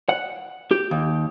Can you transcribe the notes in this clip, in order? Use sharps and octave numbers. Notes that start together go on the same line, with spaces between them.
F#5
G4
D#2